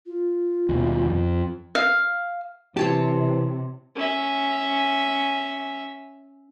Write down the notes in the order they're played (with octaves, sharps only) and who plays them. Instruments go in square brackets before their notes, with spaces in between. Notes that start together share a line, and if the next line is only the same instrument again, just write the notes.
[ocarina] F4
[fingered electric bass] D#2 B2
F2
[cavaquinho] F5
[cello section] C3 [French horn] E3 [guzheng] C4 C#5 A5 [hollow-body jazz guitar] G4
[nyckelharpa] C#4 E5